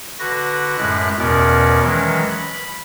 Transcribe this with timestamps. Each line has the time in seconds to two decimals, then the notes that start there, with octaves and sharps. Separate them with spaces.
0.19 D3 F#4 B4 A#6
0.78 F#2 A2 G#3 B5 F#6
1.19 E2 B2 C#4 A#4 D5
1.82 D#3 E3 F#3 G#3 C#4
2.30 B5